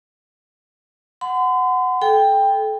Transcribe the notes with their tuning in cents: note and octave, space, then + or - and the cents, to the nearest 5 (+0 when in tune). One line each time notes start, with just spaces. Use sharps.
F#5 +0 C6 -45
A4 -30 G5 +15